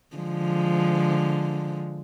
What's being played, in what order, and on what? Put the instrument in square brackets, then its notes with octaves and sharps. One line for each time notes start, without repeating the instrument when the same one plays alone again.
[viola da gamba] D3 F3 G#3